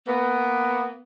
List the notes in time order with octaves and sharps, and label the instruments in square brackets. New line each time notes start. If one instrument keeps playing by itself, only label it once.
[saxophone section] A#3 B3